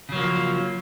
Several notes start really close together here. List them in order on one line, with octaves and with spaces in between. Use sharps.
C#3 F#3 A#3 F3